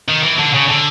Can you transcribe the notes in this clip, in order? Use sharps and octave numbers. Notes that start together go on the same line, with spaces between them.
D#3
E3
D3
C#3
D3